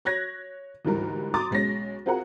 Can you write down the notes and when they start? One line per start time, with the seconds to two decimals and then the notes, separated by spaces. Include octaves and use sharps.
0.05 C#5 F#6 G#6 A#6
0.85 D2 G#2 E3 G3 A#4
1.34 A#5 C6 D6 D#6 A6
1.51 B1 G#3 C#4 A#6
2.06 C4 F4 F#4 G#4 A#4 F#5